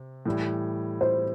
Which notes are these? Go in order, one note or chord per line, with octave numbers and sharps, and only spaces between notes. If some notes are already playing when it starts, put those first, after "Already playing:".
Already playing: C3
A2 E3 G3
C5